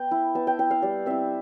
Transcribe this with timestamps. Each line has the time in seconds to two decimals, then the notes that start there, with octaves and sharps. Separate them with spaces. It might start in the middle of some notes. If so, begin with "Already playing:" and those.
Already playing: B3 G5
0.11 E4
0.35 B3 A5
0.47 G5
0.59 E4 G5
0.71 F5
0.82 G3 D5
1.06 C4 E4 E5